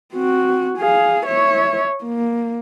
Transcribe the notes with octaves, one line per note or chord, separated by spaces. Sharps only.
C4 F#4
G#4 F5
C#5 E5
A#3